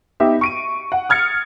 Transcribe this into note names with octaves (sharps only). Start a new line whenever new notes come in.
B3 D#4 G4 E5
C#6 D7 D#7
F#5
D#6 F6 G#6 A6 C#7